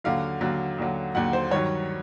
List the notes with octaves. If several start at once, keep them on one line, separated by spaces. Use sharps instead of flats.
D#2 D3 F#3 F5
D#2 D3 F#3
D#2 D3 F#3
D#2 D3 F#3 F#5
C5
G2 D#3 F#3 C#5